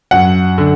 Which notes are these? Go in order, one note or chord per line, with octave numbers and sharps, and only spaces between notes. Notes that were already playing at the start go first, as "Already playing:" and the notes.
F#2 F#5
D3